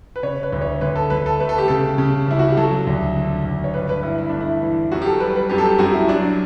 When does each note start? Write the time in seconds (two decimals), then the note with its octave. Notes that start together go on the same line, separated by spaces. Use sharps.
0.16 B4
0.23 C#3 C#5
0.43 B4
0.52 D2
0.62 C#5
0.81 D2 B4
0.96 A4
1.10 D2 B4
1.26 A4
1.40 A3 B4
1.49 A4
1.58 G4
1.68 C#3 A4
1.98 C#3
2.28 C#2 E4
2.39 F#4
2.49 G4
2.57 F#3 A4
2.87 D2
3.16 D3
3.45 D2
3.64 C#5
3.74 G2 B4
3.89 B4
4.03 G2 E4
4.18 E4
4.29 A3 D4
4.41 E4
4.62 E3
4.92 F#2 F#4
5.02 G4
5.06 A4
5.20 G3 B4
5.36 B4
5.49 F#2 G4
5.58 A4
5.65 G4
5.79 F#2 F#4
5.94 E4
6.08 F#3 D4